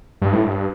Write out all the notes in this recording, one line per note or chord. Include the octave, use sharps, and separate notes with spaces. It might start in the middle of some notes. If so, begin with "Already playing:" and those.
G2
A2
G2